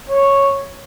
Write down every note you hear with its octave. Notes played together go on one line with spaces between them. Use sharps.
C#5